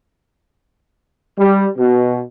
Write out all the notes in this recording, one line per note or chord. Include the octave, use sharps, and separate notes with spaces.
G3
B2